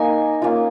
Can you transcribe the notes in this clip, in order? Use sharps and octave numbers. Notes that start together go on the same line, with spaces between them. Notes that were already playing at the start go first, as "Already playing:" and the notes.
Already playing: A#3 D#4 G#5
A#3 C#4 F4